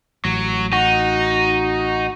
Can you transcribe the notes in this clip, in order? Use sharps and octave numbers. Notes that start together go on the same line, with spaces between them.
A1 F#3
D#4 F#4